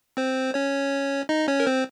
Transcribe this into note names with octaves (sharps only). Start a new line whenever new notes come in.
C4 C5
C#4 C#5
D#4 D#5
C#4 C#5
A#4
C4 C5